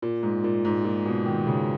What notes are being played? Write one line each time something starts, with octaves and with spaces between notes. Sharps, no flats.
A#2
G#2
A#2
G#2
A#2
B2
D#3
C#3